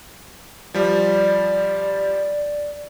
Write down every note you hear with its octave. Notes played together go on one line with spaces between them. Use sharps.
F3 G3 D5